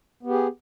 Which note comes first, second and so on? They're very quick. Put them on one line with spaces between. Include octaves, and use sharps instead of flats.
B3 G4 G#4